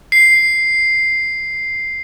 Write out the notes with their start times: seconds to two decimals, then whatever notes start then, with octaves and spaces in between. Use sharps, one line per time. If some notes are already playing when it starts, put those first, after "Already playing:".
0.12 C7